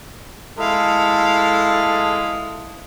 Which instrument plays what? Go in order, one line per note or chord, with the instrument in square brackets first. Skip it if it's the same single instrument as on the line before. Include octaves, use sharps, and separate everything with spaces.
[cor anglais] G#3 [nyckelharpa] E4 F5 [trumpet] A4